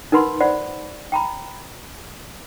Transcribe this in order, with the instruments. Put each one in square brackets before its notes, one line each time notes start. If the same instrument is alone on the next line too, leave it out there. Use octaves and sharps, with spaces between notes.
[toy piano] D#4 A#4 B4 F#5 B5 C6
C5 D5 F#5 B5
G5 A#5 B5